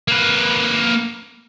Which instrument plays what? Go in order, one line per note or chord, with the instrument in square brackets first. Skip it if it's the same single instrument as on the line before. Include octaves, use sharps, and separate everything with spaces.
[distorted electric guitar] A#3 B4